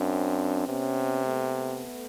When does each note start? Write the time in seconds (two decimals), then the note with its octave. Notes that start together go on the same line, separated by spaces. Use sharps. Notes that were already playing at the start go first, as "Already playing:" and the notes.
Already playing: F#2 C4 D4
0.68 C3 B3 C#4
1.25 A3 B3